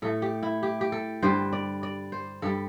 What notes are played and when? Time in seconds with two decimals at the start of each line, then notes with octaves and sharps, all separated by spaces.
0.02 A2 A3 A4
0.22 G4
0.43 E4
0.63 G4
0.81 G4
0.92 A4
1.22 G2 D3 G3 C5
1.53 D5
1.83 D5
2.12 C5
2.42 G2 G3 A4